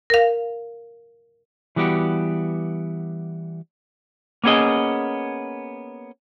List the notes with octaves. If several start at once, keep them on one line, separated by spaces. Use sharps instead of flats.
A#4 F5
E3 G3 B3 F#4 G4
A#3 B3 C#4 G#4 D#5